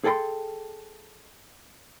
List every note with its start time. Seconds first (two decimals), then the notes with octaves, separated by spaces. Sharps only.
0.04 G#4 A4 G5 A#5 C6